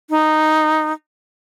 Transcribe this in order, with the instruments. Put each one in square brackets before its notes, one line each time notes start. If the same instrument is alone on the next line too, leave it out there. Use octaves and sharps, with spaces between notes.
[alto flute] D#4